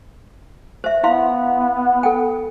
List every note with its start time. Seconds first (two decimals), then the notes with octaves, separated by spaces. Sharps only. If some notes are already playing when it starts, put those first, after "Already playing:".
0.84 C5 E5
1.04 B3 E4 F5 C6
2.03 A4 G5